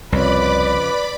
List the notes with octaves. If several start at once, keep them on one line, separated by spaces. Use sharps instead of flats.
C2 F2 C#3 B4 D5 B5 D6